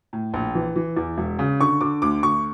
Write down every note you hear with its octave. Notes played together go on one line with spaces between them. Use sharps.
A2
A#1
E3
E3
E2
E1
C#3
D3 C#6
D3 D6
D2 D6
D2 C#6